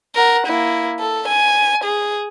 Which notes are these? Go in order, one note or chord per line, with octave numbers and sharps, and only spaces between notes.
A#4 F#5
A#3 E4
A4
G#5
G#4